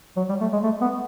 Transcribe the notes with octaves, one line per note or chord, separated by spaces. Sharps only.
F#3
G3
A3
G#3
A3
B3